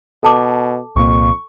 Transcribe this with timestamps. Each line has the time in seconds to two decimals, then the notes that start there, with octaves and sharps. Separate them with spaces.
0.23 B2 A4 A5 D6
0.96 C2 F2 A#2 A#3 C#6